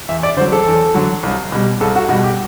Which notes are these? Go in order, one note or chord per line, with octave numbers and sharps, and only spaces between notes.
E2 E5
D5
D3 F#3 C5
A4
E2
D3 F#3
C2
B2 G3
C2 A4
F#4
B2 G3 F#4
G4